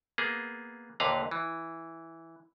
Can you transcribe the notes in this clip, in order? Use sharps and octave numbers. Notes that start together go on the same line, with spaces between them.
A#3 B3 G#4
D#2 A#2 D3 B4 F5 A#5
E3